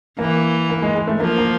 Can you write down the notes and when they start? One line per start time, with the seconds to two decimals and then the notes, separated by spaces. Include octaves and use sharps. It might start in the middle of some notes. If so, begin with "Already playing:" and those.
0.19 E3 A#3
0.70 A#3
0.82 G#3
0.95 G#3
1.07 A3
1.20 F3 A#3
1.38 A#3